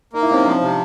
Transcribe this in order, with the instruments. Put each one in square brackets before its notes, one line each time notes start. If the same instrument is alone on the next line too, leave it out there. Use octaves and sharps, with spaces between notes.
[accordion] A#3 [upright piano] D#4
[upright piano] E4
[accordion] C3 [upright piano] C#4 D#4
[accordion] F3 [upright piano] C4 D4
[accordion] C3